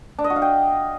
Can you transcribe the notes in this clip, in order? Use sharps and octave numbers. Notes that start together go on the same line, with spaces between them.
D4
D#5
F#4
F5
G5